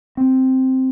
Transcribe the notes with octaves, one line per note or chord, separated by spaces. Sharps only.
C4